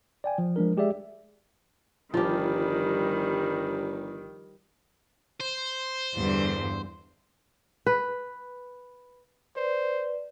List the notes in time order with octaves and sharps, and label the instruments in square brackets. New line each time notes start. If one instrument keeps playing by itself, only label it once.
[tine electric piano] D5 G5 G#5
F3
F3 G#3 D4 A#4
G#3 G4 G#4 D5 E5
[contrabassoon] G1 [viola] D#3 G3 [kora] F3 G4
[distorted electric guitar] C5
[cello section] E2 G2 D3
[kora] B4
[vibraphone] B4 D5 [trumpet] C5